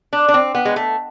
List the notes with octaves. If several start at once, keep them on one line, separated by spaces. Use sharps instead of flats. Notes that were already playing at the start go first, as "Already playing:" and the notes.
D4
D4
C4
B3
G#3
A3